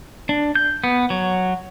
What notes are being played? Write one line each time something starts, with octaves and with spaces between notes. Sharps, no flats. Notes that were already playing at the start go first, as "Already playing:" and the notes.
D4
G6
B3
F#3